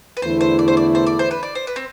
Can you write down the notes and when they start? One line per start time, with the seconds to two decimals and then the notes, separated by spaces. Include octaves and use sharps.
0.17 B4
0.22 E2 D3 A3 E4 C5
0.41 C5
0.59 D5
0.68 C5
0.77 D5
0.95 C5
1.07 D5
1.19 C5
1.31 B4
1.43 D5
1.55 C5
1.67 B4
1.76 C4